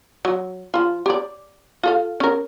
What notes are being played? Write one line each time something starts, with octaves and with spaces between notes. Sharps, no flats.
F#3
F3 F4
G4 C#5 D5
F4 A4 F5
C#4 A#4